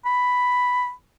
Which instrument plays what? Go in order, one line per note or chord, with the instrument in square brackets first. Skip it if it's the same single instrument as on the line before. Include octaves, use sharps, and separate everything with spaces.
[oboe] B5